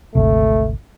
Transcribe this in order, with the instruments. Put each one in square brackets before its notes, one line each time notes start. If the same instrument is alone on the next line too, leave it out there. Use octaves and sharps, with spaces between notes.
[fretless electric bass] G#1 D2 C3 [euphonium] A3